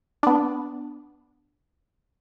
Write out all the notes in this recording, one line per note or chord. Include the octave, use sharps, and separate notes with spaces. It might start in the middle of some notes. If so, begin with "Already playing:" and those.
B3 D4